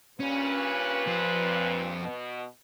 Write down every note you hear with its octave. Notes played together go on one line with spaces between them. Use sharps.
G2 A#2 C#4 B4
F2 C5
B2